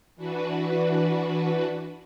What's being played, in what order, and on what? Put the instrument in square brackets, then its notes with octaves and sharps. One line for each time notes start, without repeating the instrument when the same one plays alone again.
[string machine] E3 D4 F#4 B4